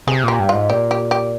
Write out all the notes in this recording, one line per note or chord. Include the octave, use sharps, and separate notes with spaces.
C3 G#4
A#2 G4
G2
F4
G#2
A#2 G4
G4
G4